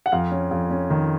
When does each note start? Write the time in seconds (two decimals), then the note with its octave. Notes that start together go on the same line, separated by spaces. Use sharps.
0.06 F#5
0.12 F2 F5
0.32 C#4
0.51 F2
0.71 C#4
0.90 D#3